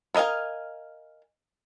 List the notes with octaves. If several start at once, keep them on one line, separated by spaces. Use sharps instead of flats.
B3 A#4 D#5 F5 G#5